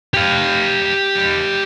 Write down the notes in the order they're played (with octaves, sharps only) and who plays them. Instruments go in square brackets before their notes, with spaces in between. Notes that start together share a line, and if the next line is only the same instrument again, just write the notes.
[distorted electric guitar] G4 F5